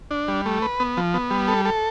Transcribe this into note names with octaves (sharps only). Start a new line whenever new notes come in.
D4
G3
A3
B4
B3
F3
B3
G3
A4
A4